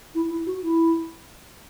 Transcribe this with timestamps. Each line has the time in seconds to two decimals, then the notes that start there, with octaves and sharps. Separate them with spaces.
0.15 E4
0.30 E4
0.46 F#4
0.62 E4